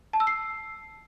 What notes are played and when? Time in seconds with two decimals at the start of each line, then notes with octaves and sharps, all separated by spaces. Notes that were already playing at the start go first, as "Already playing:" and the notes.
0.13 A5
0.20 E6
0.27 C7